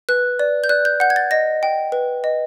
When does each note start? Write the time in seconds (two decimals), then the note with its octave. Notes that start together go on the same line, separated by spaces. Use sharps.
0.09 B4 F#6
0.39 D5
0.64 G6
0.69 D5 F#6
0.85 G6
1.00 F#5 G6
1.10 G#6
1.16 A6
1.31 D#5 A#6
1.63 G5
1.92 B4
2.24 D#5